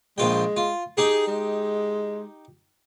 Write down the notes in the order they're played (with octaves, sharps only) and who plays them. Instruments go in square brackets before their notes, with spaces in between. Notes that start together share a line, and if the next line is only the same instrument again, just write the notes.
[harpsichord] A#1 F4 G5 [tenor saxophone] G#3
[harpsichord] F4
[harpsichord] D#4 G4 [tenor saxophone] G#4
[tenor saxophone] G#3